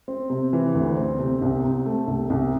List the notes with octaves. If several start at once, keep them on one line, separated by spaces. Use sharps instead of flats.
C4
C3
E3
D2
C4
C3
C2
C3
A3
C2
C2